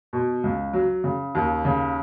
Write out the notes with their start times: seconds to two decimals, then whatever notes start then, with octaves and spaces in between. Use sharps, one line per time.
0.13 B2
0.44 C#2
0.73 F#3
1.04 C#3
1.35 D#2
1.65 C#3